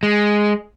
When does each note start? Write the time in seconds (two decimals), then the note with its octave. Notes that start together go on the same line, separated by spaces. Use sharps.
0.03 G#3